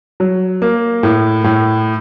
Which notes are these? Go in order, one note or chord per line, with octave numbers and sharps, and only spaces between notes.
F#3
A#3
A2
A2